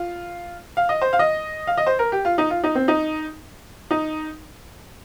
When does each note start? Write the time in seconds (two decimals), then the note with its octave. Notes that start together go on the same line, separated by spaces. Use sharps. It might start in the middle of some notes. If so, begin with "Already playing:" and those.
Already playing: F4
0.77 F5
0.89 D#5
1.02 C5
1.13 F5
1.19 D#5
1.67 F5
1.78 D#5
1.87 C5
1.99 A#4
2.12 G4
2.25 F4
2.38 D#4
2.50 F4
2.64 D#4
2.75 C4
2.88 D#4
3.91 D#4